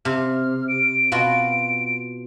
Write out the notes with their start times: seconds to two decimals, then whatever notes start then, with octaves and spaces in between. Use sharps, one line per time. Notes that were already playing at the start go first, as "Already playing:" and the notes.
0.05 C3 F6
0.68 D7
1.12 B2 F4 F#4